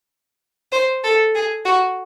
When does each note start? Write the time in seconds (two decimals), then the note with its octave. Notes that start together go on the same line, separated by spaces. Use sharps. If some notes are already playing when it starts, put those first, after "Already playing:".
0.72 C5
1.04 A4
1.35 G#4
1.65 F#4